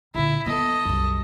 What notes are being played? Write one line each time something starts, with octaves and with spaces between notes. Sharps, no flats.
A#2 D3 E4
F3 B3 A4 D#5
C2 F#2